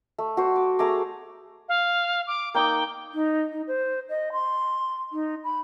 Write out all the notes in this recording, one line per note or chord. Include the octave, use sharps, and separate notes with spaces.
A3
F#4 C5
D6
A3 G#4 A#5 D6
F5
D6
A#3 D#4 G5 D6
D#4
D#4
C5
D#5
C6
D#4
B5